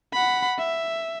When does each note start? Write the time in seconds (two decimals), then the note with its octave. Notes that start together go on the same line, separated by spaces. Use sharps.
0.13 F#5 B5
0.58 E5